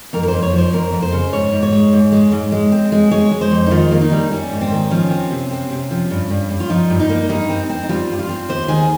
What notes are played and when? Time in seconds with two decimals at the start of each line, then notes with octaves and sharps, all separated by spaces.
0.13 F2 A#4
0.23 A#4
0.28 F2 C5
0.43 C#5
0.53 F3
0.58 C5
0.73 F2 A#4
0.93 F2
1.02 C5
1.12 C#3
1.33 G#2 C#5
1.52 G#2
1.63 C#5
1.72 G#3
1.93 G#2
2.12 G#3
2.32 G#2
2.52 G#3
2.72 C4
2.92 G#3
3.11 G#3 C#5
3.31 G#3
3.41 C5
3.51 F2
3.66 D#4
3.71 D#3 F4
3.91 A#3
4.01 D#4
4.12 G3
4.31 G3 C#4
4.51 G#2
4.61 C4
4.71 D#3
4.91 F3 C#4
5.10 C4
5.30 C3
5.51 C4
5.70 C3
5.91 F3
6.11 G2
6.30 G2
6.50 G2
6.60 F4
6.70 F3 D#4
6.90 G2
7.00 D#4
7.09 A#3
7.29 G2 D#4
7.49 C4
7.69 C4
7.83 D#4
7.89 G3 F4
8.09 G2
8.19 F4
8.29 C4
8.49 D#2 C5
8.68 D#3 G#4